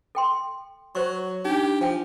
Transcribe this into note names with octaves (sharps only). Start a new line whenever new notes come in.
A4 G5 C6
F#3 C5 C#6
D4 D#4 G4
F3 G5 G#5